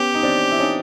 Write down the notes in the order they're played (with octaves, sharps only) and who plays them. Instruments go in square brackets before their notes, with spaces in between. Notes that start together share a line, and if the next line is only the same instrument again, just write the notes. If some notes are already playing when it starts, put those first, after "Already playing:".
Already playing: [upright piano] B3 C#4 [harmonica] G4
[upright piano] D#4
C4 D4
E4
C#4 D#4